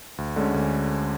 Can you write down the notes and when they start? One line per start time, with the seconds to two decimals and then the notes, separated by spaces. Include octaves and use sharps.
0.18 D2
0.36 D3 G#3 C#4
0.54 D2